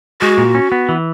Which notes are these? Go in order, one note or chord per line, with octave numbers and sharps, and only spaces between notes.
G#3 F#4
A#2
C#4
B3
E3